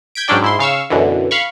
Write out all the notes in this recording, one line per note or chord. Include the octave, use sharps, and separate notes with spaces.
G6 G#6 B6 D7
G#2 F#3 C#4 D4 D5 G5
G#2 E4 C6
C#3 F5 C#6 E6
F#2 B2 D3 E3
F5 B5 C#6